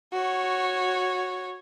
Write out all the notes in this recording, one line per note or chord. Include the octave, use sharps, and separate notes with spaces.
F#4 C#5